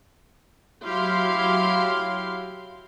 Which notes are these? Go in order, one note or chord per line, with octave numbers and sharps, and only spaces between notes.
F#3 E4 G4 F5 C6